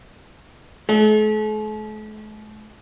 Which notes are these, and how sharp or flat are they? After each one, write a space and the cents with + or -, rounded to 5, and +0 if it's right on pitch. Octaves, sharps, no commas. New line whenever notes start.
A3 -45